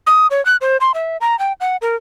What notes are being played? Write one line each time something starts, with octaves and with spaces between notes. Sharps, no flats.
D#6
C#5
F#6
C5
C6
E5
A#5
G5
F#5
A#4